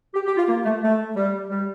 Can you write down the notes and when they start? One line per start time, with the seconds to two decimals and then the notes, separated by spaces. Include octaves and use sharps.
0.14 G4
0.27 G4
0.37 F4
0.49 A#3
0.66 A3
0.83 A3
1.16 G3
1.50 G3